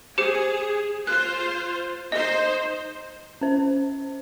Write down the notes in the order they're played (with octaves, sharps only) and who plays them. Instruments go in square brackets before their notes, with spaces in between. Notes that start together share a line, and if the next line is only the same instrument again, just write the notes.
[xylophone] G4 C5 C#7 [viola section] G#4
[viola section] F4 C5 [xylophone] F#6
[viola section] D#4 C5 [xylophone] D#5
[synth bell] C#4 C5